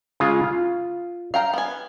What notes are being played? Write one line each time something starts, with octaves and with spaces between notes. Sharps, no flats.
C#3 G#3 F4
F4
F5 G5 A#5
B3 G#5